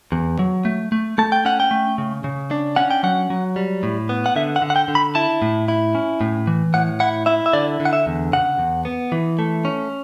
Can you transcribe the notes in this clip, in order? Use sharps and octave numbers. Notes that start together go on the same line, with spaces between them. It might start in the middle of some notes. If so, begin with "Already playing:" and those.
E2
F#3
A3
A3
A3 A5
G5
C#4 F#5
G5
A3
C#3
C#3
D4
C#4 F#5
G5
F#3 F#5
F#3
G3
A2
B3
F#5
D3 E5
F#5
D3
F#5
G5
D3
B5
E4 A5
A2
E4
C#4
A2
E3
A2 F#5
E4 F#5
E4 E5
E5
D3 D5
D3
F#5
E5
E2
C#3 F#5
E2
B3
E3
A3
C#4